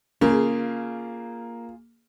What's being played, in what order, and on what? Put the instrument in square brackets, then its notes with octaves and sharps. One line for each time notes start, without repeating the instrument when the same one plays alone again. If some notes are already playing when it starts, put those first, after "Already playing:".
[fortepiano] C#3 [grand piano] A#3 [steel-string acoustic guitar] F4 G#4